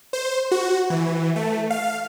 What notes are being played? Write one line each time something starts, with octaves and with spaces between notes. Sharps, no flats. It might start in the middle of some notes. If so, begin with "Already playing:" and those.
C5
F#4
E3
A3
F5